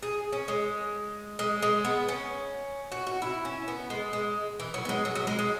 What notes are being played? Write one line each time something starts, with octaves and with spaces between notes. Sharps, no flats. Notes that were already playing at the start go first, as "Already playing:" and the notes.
G#4
C#4
G#3
G#3
G#3
B3
C#4
F#4
F#4
E4
C#4
B3
G#3
G#3
E3
F#3
B3
G#3
F#3
F#3
G#3
G#3